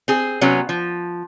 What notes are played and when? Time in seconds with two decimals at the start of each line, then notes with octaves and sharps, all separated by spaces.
0.08 C4 G#4
0.41 C3 F#3 B3 C#4
0.69 F3